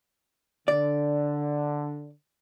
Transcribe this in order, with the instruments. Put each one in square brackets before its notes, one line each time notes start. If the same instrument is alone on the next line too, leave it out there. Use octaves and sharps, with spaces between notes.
[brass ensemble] D3 [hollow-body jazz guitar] D5